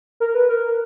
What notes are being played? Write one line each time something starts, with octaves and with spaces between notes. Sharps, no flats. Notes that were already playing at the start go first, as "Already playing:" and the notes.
A#4
B4
A#4